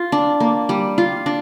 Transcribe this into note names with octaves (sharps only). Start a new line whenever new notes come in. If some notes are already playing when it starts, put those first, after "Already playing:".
Already playing: F4
D4
A#3
G3
F4
D4